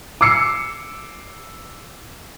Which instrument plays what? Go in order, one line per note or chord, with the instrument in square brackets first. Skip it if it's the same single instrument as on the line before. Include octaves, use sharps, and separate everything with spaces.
[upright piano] D6 E6 C7 C#7